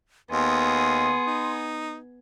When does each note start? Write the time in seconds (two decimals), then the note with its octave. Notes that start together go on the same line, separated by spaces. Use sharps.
0.31 D#2 B3 G#4 C6
1.27 D#4